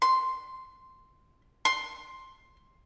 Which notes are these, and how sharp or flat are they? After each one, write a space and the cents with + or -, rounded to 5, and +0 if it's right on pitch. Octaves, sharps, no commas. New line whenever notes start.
C6 -5
C6 +10